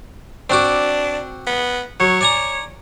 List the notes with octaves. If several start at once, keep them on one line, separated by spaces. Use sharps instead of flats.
C4 D4 F#4 D6
B3
F#3 C#5
D5 G#5 A#5